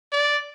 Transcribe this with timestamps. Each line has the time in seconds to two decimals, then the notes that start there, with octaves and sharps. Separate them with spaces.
0.13 D5